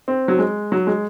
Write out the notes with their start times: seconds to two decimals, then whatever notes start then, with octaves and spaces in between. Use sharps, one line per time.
0.08 C4
0.28 F#3
0.39 G#3
0.72 F#3
0.87 G#3